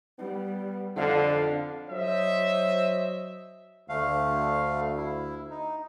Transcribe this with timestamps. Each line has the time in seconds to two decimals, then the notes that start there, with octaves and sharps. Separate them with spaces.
0.19 G3 B3
0.97 F2 D3 D4 F5
1.89 F#3 C5 C#5 D#5 E5
3.89 D2 A3 F5
4.97 E4
5.50 D#4